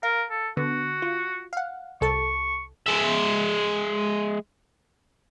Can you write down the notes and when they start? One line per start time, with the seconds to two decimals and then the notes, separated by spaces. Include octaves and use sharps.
0.03 A#4 F5
0.30 A4
0.57 D3 B3 F#4
1.02 F4
1.53 F5 F#5
2.01 C2 A4 A5 C#6
2.87 G#3 E5